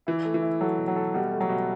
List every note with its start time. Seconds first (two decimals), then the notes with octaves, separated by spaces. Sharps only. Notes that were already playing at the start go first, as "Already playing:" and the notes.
0.07 E3 E4
0.25 A3
0.34 E3
0.42 E4
0.61 F#3 A4
0.78 B2
0.88 F#3
0.96 A4
1.14 B2 G3
1.32 A3
1.40 F#3
1.49 B2